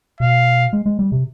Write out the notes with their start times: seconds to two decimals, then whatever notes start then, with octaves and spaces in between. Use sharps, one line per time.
0.20 B2 F5
0.73 G#3
0.86 G#3
0.99 G3
1.12 C3